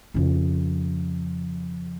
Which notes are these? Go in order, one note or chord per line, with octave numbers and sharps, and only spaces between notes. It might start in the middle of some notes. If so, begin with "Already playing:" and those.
F2 C#3